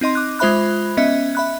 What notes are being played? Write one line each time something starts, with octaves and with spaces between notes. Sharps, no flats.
C4 D#4 D#5 C6
D6 F#6
G#3 F4 C5 E5 B5 F#6
B3 C#4 D#5 E5
E5 B5 F#6